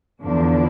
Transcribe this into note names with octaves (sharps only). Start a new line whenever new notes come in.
E2 D3 F3 D4